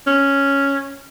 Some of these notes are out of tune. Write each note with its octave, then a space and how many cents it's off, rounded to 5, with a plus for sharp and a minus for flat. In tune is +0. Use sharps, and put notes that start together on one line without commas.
C#4 +0